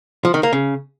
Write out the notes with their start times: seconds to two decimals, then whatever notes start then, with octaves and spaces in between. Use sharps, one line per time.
0.25 F3
0.34 D#3
0.43 A#3
0.53 C#3